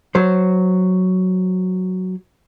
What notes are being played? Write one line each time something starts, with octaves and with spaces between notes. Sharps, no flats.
F#3 C5